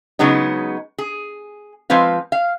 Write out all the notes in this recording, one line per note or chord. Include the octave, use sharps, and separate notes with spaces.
C#3 F#3 G#3 B3 D#4
G#4
F3 G#3 C4 B4 F5
F5